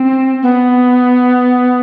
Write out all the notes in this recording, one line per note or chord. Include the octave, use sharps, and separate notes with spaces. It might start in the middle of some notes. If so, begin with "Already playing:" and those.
Already playing: C4
B3